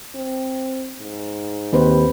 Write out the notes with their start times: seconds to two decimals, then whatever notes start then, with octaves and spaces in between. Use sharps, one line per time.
0.15 C4
1.01 G#2
1.72 D#2 C4 B4 C5